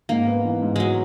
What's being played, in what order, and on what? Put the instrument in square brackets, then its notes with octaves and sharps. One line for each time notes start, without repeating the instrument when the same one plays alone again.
[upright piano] G#2 [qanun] A#3
[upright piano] B3
E3
G#2
[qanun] F#3 G#3